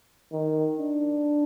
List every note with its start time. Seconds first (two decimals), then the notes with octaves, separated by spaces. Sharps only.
0.33 D#3
0.80 D4